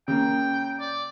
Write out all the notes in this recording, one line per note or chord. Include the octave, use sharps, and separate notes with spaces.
C#3 A#3 G5
D5